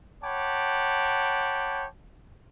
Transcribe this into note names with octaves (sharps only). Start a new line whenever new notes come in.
C#5 F#5 G5 A5 B5 D6